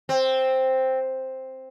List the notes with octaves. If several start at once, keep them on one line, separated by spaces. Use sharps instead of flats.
C4